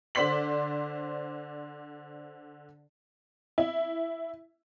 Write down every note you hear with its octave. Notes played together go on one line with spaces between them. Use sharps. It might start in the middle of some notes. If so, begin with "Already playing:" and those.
D3 C5 D5 C6 B6 F#7
E4